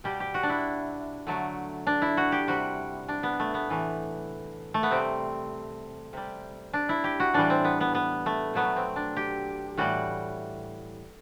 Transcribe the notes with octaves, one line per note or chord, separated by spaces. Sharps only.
B2 G3 G4
G4
F#4
D4
E4
D3 F#3 A3
D4
E4
F#4
G4
C3 G3 F#4
D4
B3
A3
B3
A2 E3 A3
A3
B3
C3 G3 C4
C3 G3
D4
E4
G4
F#4
A2 E3 G3 D4
C4
B3
B3
B3
A3
B2 F#3 A3 B3
C4
D4
G4
A2 E3 G3 F#4